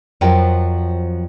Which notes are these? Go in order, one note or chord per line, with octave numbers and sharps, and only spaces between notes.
F2 F3 F#3 A#4 G5